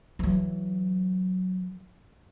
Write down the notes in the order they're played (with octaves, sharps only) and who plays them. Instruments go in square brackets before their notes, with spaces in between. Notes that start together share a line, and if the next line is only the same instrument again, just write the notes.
[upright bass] E3 F#3